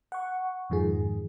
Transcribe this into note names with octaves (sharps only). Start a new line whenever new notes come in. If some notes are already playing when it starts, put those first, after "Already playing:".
F#5 C#6
F2 G#2 D#3 F3 G#4